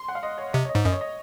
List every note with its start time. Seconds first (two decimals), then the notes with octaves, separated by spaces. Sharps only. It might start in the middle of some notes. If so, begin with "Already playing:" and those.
Already playing: C6
0.08 F#5
0.15 F5
0.23 D#5
0.38 C#5
0.53 C3 D#5
0.65 C#5
0.69 D#5
0.75 G#2
0.85 F#2 D#5
0.92 C#5
1.01 D#5